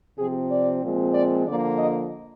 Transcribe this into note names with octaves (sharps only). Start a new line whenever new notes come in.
C3 F3 C4 G#4
D5
A#2 F3 G#3 C4
D5
D3 F3 A#3 D5
D#5